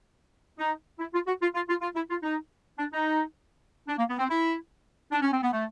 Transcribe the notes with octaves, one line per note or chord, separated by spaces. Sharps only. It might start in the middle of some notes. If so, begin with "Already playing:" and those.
D#4
E4
F4
F#4
F4
F4
F4
F4
E4
F4
D#4
D4
D#4
D4
A#3
B3
C4
E4
D4
C#4
C4
B3
A3